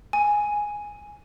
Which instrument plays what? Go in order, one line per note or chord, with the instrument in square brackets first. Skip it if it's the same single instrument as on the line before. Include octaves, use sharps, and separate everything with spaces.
[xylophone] G#5